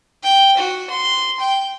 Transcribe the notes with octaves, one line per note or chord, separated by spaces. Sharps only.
G5
F#4
C6
G5